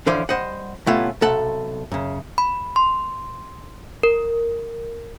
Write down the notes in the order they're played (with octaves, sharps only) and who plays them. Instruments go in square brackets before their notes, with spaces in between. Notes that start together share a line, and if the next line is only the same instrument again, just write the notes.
[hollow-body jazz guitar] D3 E3 F3 C#4 C5 D5
G3 C5 D#5 F#5
A2 C3 A3 B3 C#4 F4
B1 C3 A4 F#5 A5
F#2 C#3
[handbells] B5
C6
A#4